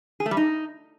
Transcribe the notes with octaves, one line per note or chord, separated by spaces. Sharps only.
G#4
A3
G3
D#4